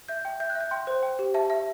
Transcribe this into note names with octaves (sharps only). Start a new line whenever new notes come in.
E5 G6
G5
E5 G6
F#6
E5
G6
G5 C6
C5
G5
G4
E5 A5
E5